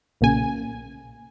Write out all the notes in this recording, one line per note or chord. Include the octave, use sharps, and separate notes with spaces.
B1 A#2 C#3 G#5